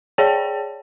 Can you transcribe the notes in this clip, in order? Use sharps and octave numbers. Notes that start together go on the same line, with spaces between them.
G#4 C#5 D5 G5 A5